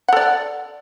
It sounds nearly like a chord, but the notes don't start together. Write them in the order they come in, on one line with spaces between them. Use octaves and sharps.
F#5 A4 D5